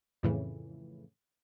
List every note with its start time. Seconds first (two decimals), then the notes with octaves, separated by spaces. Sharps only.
0.23 F2 A2 C#3 E3